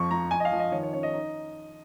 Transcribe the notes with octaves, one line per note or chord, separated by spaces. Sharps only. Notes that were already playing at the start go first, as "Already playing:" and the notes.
Already playing: F2 F3 C#6
F3 A#5
F3 G#5
D#5
F5
F3
D#5
D#3 C#5
C#5
C#4 C#5
D#5
D#4